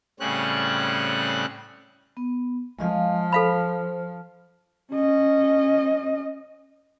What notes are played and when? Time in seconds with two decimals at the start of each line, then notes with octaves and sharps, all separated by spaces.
0.20 A2 C#3 G3 C4 C#4 F#6
2.17 B3
2.79 F3 G#3 D#5 F5
3.32 A4 C5 F5 B5
4.92 C#4 D#5